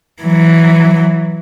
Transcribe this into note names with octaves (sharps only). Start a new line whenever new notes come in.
E3 F#3